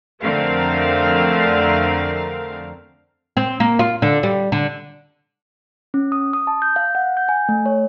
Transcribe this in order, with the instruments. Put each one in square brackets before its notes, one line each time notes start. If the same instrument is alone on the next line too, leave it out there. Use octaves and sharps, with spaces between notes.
[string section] F2 D3 A3 C4 A#4 F5
[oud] C4
A#3
F4
D3
G3
D3
[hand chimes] C#4
D#6
D#6
A5
G6
F5
F#5
G6
G#5
A3
C#5